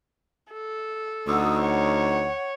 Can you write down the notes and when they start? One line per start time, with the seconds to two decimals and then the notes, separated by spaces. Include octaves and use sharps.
0.53 A4
1.27 D2 D#4 F#4 D#6 E6
1.60 C#5 F#5